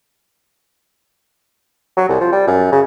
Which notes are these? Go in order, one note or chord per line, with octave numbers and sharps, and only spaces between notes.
F#3
C2
F3
G3
F#2
C#3